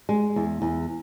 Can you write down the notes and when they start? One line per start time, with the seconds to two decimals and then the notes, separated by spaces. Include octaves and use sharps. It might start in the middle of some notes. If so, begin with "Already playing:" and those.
0.09 G#3
0.36 E2
0.62 E2